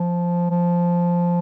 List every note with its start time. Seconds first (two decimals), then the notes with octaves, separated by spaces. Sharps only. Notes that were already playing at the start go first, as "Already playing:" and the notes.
Already playing: F3
0.51 F3